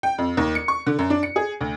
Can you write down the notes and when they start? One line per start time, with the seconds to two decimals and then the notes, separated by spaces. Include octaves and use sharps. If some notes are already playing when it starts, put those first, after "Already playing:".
0.03 G5
0.18 F2
0.37 D#2
0.55 C#7
0.68 C#6
0.87 D3
0.99 F#2
1.10 D4
1.23 C#7
1.36 G#4
1.61 D2